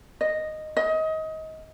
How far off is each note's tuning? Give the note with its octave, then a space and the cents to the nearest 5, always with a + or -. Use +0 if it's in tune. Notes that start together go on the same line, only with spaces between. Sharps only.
D#5 -5
D#5 +25